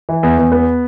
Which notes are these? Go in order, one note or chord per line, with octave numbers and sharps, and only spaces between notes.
E3
E2
E2
B3